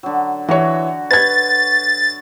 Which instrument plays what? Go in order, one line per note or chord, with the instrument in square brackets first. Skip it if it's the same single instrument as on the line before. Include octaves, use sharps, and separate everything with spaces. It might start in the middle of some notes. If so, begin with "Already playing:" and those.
[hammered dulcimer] D3 F#3
[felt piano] E3 C#5 [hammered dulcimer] F#4
[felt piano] B4 G#6 [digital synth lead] A6